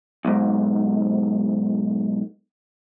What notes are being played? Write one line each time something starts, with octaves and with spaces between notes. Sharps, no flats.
B1 G#2